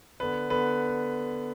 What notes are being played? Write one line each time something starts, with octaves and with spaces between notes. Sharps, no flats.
D3 B3 B4
D3 B3 B4